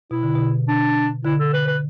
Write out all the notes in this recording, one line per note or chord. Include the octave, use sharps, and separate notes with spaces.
B2 E4
D3
B2
D4
D3 E4
A4
B4
B4